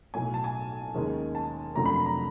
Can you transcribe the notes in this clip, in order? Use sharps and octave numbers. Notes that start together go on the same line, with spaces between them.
B1 A2 F#3 G#5
A5
G#5
D#2 D#3 G#3 C#4
A5
F1 F2 D3 F#3 A3 A#5
B5
B5
A#5